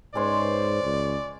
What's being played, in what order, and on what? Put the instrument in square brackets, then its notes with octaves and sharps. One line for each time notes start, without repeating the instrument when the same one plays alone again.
[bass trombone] G#2 [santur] G#3 C#4 C6 [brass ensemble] B4 C5 [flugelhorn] D5
[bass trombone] C#2